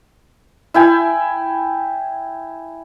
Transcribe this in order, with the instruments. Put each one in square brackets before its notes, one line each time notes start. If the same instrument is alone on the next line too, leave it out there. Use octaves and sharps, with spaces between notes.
[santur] E4 G5 G#5